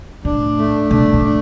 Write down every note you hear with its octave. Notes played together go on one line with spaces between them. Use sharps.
A2 D4
A3
B2 D4
A2
D4